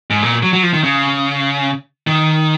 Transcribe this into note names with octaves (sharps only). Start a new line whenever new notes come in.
G#2
A#2
F#3
F#3
F3
D#3
C#3
D#3